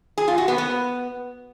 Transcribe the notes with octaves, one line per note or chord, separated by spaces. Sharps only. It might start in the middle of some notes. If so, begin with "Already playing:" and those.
G#4
F4
F#4
B3
B3